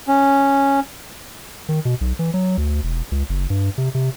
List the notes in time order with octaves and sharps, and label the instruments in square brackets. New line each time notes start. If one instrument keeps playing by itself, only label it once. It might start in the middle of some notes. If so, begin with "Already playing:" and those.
[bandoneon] C#4
[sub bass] D#3
B2
B1
E3
F#3
D2
E1
C#2
F#1
G2
C3
C3